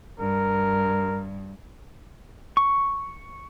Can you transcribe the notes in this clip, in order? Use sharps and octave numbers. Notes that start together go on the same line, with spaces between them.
G2 A#4
C#6